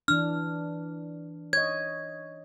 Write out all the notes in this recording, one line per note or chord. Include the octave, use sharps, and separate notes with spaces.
E3 D4 F6
C#5 D#5 G#6